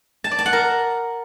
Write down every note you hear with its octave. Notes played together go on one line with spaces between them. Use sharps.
A5
D5
A5
F#5
A#4